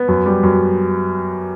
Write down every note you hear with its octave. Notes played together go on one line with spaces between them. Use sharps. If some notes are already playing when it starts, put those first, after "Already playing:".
Already playing: B3
F#2
G3
F#2